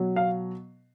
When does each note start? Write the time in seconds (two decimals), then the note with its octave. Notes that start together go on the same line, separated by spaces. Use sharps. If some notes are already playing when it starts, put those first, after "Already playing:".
Already playing: B2 F#3
0.16 F5